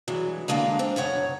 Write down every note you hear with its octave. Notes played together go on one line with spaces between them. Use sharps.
G2 E3 F#3 G#3
D3 G#3 A#3 D4 F5
C4 D4
F#2 C#3 C#5 F#5